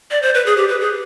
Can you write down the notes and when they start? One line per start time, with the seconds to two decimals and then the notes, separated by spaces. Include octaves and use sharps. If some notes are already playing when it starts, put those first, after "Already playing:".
0.11 D5
0.22 C5
0.35 B4
0.46 G#4
0.57 G4
0.69 B4
0.81 G#4